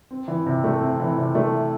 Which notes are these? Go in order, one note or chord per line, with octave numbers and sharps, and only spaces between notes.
C4
E3
C3
A3
C4
E3
C3
A3